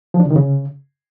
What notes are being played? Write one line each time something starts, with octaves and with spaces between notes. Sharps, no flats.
F3
D4
C#3
D#3
C#3